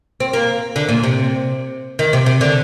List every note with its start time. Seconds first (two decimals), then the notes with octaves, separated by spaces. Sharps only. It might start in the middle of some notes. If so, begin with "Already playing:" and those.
0.20 C4
0.33 A#3
0.76 D3
0.89 A#2
1.04 C3
1.99 D#3
2.13 C3
2.26 C3
2.41 D3